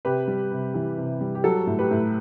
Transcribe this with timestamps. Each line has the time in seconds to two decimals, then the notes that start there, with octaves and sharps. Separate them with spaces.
0.05 C3 G4 B4
0.28 G3
0.52 C3
0.74 E3
0.98 C3
1.21 G3
1.35 G4
1.44 F#3 F#4 A4
1.67 A2
1.79 G4 B4
1.91 A2